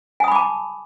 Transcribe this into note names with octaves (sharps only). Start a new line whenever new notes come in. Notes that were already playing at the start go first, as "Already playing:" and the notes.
G#5 A5 B5 D6 D#6